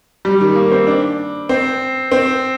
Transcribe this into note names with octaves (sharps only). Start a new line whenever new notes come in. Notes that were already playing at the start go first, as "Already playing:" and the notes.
G3
D#3
A#3
C4
D4
C4
C4